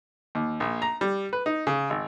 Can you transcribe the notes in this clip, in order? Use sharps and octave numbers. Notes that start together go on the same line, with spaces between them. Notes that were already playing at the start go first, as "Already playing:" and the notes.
D#2
A#1
A#5
G3
B4
D#4
C#3
G#1